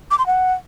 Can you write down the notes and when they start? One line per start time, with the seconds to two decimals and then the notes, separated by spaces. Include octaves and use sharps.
0.11 D6
0.19 C6
0.27 F#5